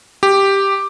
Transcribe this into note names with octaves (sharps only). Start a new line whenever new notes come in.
G4